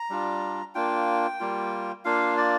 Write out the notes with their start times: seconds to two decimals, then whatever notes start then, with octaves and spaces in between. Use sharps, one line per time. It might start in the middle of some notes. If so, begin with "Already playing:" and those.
Already playing: A#5
0.10 G3 D4 F4
0.75 A#3 D4 F4 G5
1.40 G3 A#3 F4
2.05 A#3 D4 F4 F5
2.37 D5